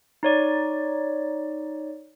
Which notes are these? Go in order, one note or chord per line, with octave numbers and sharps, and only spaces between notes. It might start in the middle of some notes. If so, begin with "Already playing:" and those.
D#4 C#5 D5